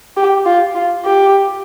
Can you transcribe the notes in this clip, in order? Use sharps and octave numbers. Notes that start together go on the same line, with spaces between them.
G4
F4
F4
G4